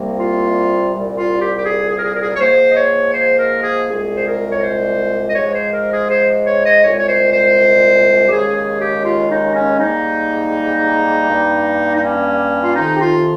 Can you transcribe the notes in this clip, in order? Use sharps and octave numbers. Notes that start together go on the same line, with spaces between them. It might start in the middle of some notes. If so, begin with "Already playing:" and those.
Already playing: C2 C3 G3 A#3
F4
C2 A#2 G3
F4
G4
G4
G#4
G#4
A#4
G#4
A#4
G#4
A#4
C#5
G#2 F3 A#3 C5
D#5
C#5
C5
A#4
G#4
C2 A#2 G#3 G#4
C5
A#4
C#5
C5
D#5
G#2 F3 G#3 C#5
C5
A#4
G#4
C5
C#5
D#5
C2 A#2 G#3 C#5
C#5
C5
C5
G4
D#2 C#3 G#3 G#4
G#4
G4
F4
D#4
C#4
G#2 G3 A#3 D#4
G2 G3 A#3
D#4
C#4
F4
F2 C3 D#3 D#4
G4
F4